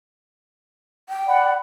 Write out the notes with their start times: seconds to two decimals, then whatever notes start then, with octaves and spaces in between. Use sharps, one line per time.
1.09 G5
1.26 D5 F#5 B5